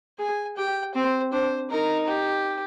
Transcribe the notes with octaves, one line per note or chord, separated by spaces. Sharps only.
G#4 G#5
G4 G5
C4 C5
D4 C5
D#4 A#4
G4